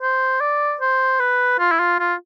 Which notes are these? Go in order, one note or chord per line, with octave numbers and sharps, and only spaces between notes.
C5
D5
C5
B4
F4
E4
F4
F4